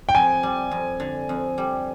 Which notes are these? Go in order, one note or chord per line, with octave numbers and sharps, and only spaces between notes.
G5
F2 G#5
G3
F2
D3
F2
G3